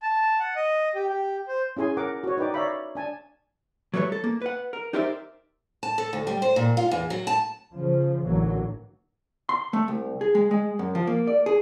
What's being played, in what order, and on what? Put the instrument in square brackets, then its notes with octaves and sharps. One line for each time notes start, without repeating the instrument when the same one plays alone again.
[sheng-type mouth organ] A5
F#5
D#5
G4
G4
C5
[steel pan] C#4 E4 G#4 G#5 C6
A#4 F#5 D6
F#4 C#5
D#4 B4 D5 G5 D6
C#5 D5 E5 F5 A#5 B5
D4 G#5 A5
[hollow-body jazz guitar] F#3 G3 A3 B4 C#5
A4
A#3
B4 F#5
A#4
D#4 G4 A#4 C5 D5 E5
[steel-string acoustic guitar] A5
A4
D2
G3
C5
A#2
F4
E2
F#3
A5
[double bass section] C#3 F3
A1 G#2 D3 E3 F#3 A#3
[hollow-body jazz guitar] C6
A3
C2
G#4
G#3
G#3
F#2
F3
A#3
D5
G#4